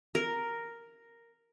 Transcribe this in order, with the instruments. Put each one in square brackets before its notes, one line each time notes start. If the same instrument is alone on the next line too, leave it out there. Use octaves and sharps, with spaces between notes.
[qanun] A#4